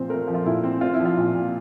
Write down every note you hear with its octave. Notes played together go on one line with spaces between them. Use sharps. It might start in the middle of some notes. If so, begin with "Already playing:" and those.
Already playing: A#2 F3 C4 C5
A3 A#4
F3
F4
A#2 E4
C4
C4 F4
E4
F3
F4
A#2
A#2